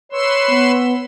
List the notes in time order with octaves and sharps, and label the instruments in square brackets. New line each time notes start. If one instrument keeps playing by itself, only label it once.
[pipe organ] B4 C6 E6 [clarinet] C#5
[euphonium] B3